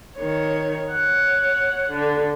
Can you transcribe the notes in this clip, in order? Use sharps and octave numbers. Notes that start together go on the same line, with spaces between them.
D#3 C#5
C#5 F#5
D3